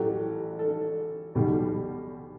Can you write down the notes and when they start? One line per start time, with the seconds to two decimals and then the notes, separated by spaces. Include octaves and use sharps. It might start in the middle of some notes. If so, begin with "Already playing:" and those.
Already playing: A1 A2 F#3 A3 G4
0.59 A4
1.35 B1 B2 G3